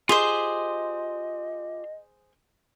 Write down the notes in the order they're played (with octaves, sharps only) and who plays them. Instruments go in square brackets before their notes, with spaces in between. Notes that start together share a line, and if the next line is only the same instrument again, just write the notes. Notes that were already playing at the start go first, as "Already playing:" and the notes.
[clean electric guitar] F4 G4 C6 [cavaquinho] G#4 C5 [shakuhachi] D#5